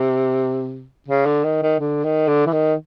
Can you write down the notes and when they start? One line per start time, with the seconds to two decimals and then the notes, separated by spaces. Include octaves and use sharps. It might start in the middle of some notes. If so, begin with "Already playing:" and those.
Already playing: C3
1.08 C#3
1.26 D3
1.44 D#3
1.62 D#3
1.79 D3
2.04 D#3
2.28 D3
2.46 E3
2.53 D#3